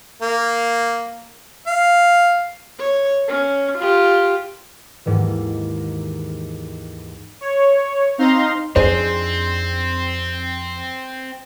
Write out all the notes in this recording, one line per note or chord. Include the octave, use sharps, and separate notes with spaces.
A#3
F5
C#5
C#4
F4 G4
D#2 G#2 D#3 E3
C#5
C4 D#4 F5 A#5 C6
F2 C4 D4 D#4 G#4 C5